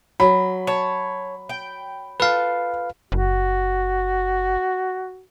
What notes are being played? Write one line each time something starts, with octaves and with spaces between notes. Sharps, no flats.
F#3 B5
C#5 A5
G5
F4 A4 B4 F5
F#1 F#4